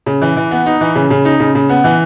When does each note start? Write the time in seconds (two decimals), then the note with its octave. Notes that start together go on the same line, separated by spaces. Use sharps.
0.06 C#3
0.22 E3
0.36 E3
0.51 B3
0.66 D#4
0.81 E3
0.95 C#3
1.10 C#3
1.25 D#4
1.40 C#3
1.55 C#3
1.69 B3
1.84 E3